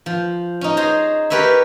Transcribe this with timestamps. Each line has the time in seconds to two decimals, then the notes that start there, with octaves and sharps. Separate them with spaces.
0.06 F3
0.61 C#4 D#4
0.77 G#4 C5 A#5
1.30 G4 A#4 B4 C#5 E5